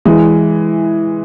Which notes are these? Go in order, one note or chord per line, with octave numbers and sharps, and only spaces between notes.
E3 G#3